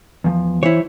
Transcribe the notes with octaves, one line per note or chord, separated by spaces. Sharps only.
E2 F3
E3 E4 C5 C#5